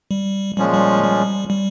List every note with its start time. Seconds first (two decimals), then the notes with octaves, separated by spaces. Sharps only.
0.11 G3
0.57 A#2 F3 G3 G#3 C#4
0.74 G3
1.03 G3
1.50 G3